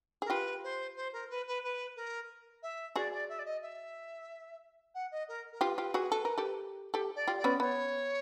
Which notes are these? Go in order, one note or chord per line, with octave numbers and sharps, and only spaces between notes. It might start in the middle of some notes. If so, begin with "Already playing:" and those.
G#4
A#4
F4 G4 B4
C5
C5
A#4
B4
B4
B4
A#4
E5
F#4 G#4 D5
D5
E5
D5
D#5
E5
F#5
D#5
A#4
A#4
F4 G4 B4
F4 G4
F#4 G#4
A4
A#4
G4 A4
G4 A4
D5
F4 G4
D5
B3 C#4
B3 C#5